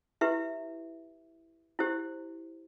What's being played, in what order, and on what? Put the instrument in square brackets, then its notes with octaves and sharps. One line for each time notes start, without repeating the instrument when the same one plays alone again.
[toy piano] E4 G4 B4 E5
E4 G4 C5